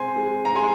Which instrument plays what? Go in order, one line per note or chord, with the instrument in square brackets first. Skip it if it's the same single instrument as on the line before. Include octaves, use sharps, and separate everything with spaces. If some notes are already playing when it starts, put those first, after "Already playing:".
Already playing: [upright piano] G#3 C4 G#5 C6
G#3
A#5
G#3 G#5 C6